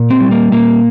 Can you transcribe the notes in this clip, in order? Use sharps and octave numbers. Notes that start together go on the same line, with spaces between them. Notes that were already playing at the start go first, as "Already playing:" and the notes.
Already playing: A#2
C4
G3
A#3
A#2 A#3